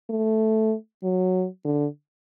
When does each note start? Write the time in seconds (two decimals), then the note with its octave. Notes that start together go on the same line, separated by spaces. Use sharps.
0.10 A3
1.03 F#3
1.65 D3